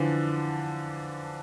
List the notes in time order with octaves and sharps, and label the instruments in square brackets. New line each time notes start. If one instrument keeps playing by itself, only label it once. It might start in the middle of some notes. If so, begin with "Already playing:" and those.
Already playing: [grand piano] D3 E3 F3